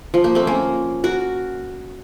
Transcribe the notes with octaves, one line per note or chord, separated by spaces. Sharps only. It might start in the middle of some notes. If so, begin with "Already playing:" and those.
F3
A#3
A3 C4
A#3 C#4
F#4 A#4